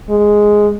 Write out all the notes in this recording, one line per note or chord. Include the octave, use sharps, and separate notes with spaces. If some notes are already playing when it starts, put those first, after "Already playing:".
G#3